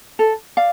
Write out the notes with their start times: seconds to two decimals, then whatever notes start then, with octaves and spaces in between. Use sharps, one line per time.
0.19 A4
0.57 D5 F5